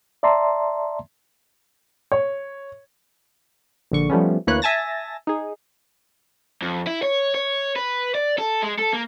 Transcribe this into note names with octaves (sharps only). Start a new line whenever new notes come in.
D5 E5 A5 A#5 C6
C#5
A#1 D3 C#6
F3 G3 A3 B3 C#4
D2 E3 A#3 B4 C#5 F#6
E5 G#5 A5 A6 A#6
D#4 G#4
F2
E4
C#5
C#5
B4
D5
A4
G#3
A4
A#3